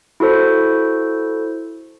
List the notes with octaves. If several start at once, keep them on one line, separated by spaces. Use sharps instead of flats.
E4 F#4 A4 C5